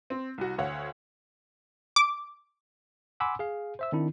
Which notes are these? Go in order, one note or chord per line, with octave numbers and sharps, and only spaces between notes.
C4
C2 F#4
D2 C#5 F5 F#5
D6
F#5 G#5 B5 C6 D6 E6
G#4 F5
C5 E5 E6
D#3 C4 D4 E4